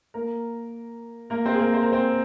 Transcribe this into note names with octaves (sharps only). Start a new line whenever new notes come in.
A#3 A#4
A#3 A#4
C4 C5
G#4
A#3 A#4
C5
A#4
C4 C5